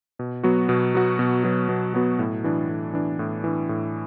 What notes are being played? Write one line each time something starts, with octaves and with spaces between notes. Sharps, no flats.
B2
F#3 B3 F#4
B2
F#3 B3 F#4
B2
F#3 B3 F#4
B2
F#3 B3 F#4
A2
E3 D4
A2
E3 D4
A2
E3 D4
A2